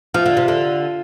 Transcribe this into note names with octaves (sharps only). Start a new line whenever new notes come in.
F3 F4
D3
C3
D3